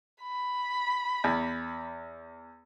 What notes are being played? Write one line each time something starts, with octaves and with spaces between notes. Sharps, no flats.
B5
E2